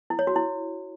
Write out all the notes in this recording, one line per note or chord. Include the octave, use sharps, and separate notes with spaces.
E4
C#5
F#4
E4